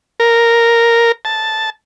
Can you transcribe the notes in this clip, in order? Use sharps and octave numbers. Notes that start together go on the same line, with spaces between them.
A#4
A5